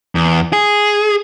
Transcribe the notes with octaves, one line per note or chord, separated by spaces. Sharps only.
E2
G#4